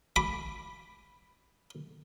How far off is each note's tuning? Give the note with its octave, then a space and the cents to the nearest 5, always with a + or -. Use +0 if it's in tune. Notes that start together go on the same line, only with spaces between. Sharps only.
B5 +0 D6 +0